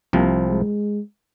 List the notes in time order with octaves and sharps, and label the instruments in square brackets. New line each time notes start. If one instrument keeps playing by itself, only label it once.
[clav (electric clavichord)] C2 C3 F3 [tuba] A#3
[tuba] G#3